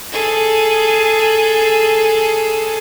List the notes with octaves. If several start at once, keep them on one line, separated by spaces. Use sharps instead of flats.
G#4 A4